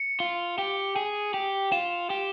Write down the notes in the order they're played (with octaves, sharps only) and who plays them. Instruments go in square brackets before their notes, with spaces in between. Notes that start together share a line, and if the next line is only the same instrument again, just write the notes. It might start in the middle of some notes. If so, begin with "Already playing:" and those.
Already playing: [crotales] C#7
[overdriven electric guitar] F4
G4
G#4
G4
[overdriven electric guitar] F4 [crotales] E7
[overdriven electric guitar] G4